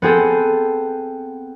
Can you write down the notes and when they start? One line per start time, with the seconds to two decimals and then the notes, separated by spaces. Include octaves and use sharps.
0.02 B3 C4 G#4 A4